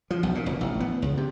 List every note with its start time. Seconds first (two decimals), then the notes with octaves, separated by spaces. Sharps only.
0.11 F3
0.23 B1
0.35 A#2
0.46 F1
0.61 A1
0.80 B3
1.02 C#2
1.17 C3